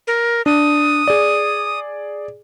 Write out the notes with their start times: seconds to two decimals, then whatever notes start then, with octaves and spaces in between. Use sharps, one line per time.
0.07 A#4
0.46 D4 D#6
1.08 G#4 D5